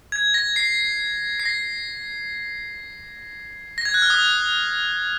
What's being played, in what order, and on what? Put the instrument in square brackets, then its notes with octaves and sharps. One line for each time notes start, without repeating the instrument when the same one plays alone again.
[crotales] G#6
A#6
C7
C7
A#6
A#6
G#6
F#6
F6
D#6